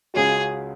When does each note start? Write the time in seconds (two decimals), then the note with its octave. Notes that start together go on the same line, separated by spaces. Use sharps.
0.14 C#2 C#3 G#3 C#4 F#4 G#4